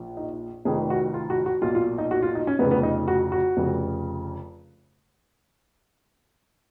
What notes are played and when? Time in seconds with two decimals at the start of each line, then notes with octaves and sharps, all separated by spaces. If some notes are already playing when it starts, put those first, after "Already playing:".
Already playing: A#1 A#2
0.17 D#4
0.65 F1 F2 D#3 G#4
0.90 F#4
1.14 F4
1.30 F#4
1.46 F#4
1.62 B1 A#2 F4
1.75 F4
1.98 D#4
2.11 F#4
2.22 F4
2.35 D#4
2.47 C#4
2.59 F1 F2 C#3 B3
2.71 B3
2.83 D#4
3.08 F#4
3.32 F#4
3.57 F1 F2 C#3